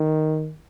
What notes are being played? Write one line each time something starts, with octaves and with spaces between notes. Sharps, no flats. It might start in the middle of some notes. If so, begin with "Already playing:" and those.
Already playing: D#3